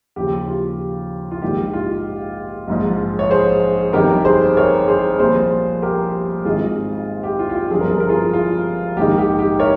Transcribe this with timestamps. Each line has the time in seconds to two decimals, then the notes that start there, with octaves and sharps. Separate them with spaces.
0.16 D#2 C#3 F3 G4
0.47 F4
1.31 F4
1.42 A#1 G#2 D#3 G4
1.73 F4
2.67 A#1 G#2 F3
3.19 C#5
3.30 G#4 C5
3.93 G1 F2 D#3 G4 A#4
4.25 G#4 C5
4.57 A#4 C#5
4.88 G#4 C5
5.19 C2 A#2 F3 G#4 C5
5.82 G4 A#4
6.45 G#1 G#2 D#3 F4 G#4
7.23 G4
7.39 F4
7.49 F4
7.55 G4
7.70 G1 G2 F3 G#4
7.81 A#4
7.90 G#4
8.00 A#4
8.09 F4 G#4
8.33 F4
8.97 A#1 G#2 D#3 G4
9.18 G4
9.39 G4
9.60 A#4 C#5